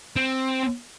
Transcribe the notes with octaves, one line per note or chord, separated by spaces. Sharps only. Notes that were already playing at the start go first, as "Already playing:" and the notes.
C4